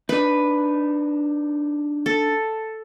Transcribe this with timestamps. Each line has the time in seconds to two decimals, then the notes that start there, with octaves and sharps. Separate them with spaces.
0.09 D4 D#4 B4
2.06 A4